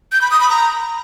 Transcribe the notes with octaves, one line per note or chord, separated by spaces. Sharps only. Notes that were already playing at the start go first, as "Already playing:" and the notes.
G6
B5
D#6
B5
A#5